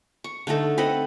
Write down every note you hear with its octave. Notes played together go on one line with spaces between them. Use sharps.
C#6
D3 A3 D#4 A4
C4 B4 D#5 F#5